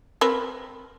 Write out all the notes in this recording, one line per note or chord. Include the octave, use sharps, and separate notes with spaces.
C4 A#4 B4